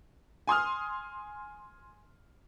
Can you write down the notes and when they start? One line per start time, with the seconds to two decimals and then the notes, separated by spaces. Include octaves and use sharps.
0.47 G#5 C6 D#6 F6